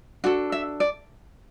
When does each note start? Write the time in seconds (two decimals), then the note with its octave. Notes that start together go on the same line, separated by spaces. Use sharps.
0.24 D4 F#4 A4 F#5
0.52 E5
0.80 D5